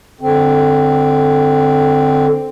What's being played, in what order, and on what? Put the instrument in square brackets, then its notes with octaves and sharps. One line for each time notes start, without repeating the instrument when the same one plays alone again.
[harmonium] D3 C4